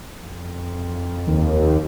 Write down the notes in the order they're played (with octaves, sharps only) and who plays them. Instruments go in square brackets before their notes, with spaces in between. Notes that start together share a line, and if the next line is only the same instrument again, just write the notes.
[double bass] F2
[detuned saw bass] D#2